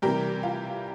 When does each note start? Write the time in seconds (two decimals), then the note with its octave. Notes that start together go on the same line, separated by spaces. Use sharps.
0.02 C3 E3 G3 G4 A#4
0.43 F4